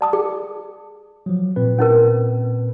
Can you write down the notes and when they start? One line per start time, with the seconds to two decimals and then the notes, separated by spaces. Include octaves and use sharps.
0.01 D5 A5 D#6
0.13 G#4
1.26 F3 F#3
1.56 A#2 C4 B4
1.78 C#4 D#4 A#4